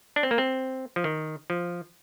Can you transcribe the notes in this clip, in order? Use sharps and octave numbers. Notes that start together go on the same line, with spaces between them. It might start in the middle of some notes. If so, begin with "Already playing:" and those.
D4
C4
A#3
C4
F3
D#3
F3